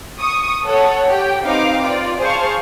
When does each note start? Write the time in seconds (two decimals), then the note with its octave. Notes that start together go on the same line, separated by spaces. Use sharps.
0.20 C#6 D#6
0.64 A4 C#5 F#5
1.09 G4 G5
1.44 C4 D#4 B4 F5 D6
1.85 F4 D5
2.20 G#4 C5 F5 A5 C#6